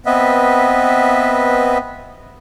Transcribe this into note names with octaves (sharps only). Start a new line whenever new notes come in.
B3 C4 B4 D#5 E5